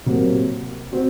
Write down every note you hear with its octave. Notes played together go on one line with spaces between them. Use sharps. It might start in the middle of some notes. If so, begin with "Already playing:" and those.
C3 F#3 A#3
C4 F#4